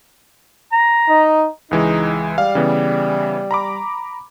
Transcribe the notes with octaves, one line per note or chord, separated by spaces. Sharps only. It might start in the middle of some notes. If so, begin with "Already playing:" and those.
A#5
D#4
C#2 E3 G#3 D#4
G3 F5
C#3 E3 B3
A#5 B5 D6